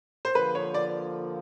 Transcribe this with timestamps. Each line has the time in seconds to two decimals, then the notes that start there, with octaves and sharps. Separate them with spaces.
0.25 C5
0.35 D3 F3 A#3 B4
0.55 C#5
0.74 D5